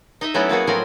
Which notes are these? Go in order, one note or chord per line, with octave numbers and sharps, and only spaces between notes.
D#4 D#5 E5
F#3 A3 B3 C#4 E4 F#4
A#3 B3 F#4 G#4
A2 F3 F#3 C4 A#4 G#5